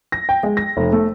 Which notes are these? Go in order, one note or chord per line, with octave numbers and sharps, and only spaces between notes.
A#6
G5
G#3
A#6
F1
A3